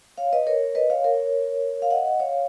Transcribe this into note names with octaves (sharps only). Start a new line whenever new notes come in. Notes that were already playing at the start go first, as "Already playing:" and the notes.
C#5 F5
B4 D#5
A#4 C#5
B4 D#5
C#5 F5
A#4 C#5
F5
D#5 F#5
C#5 F5